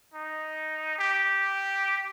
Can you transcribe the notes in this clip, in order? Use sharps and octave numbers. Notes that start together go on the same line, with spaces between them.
D#4
G4